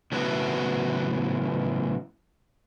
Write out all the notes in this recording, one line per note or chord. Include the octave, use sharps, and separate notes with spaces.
A2 C#3 E3 F#3 B3 F#4